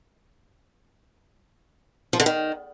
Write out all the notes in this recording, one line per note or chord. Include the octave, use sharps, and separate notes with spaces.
F3
D3
D#3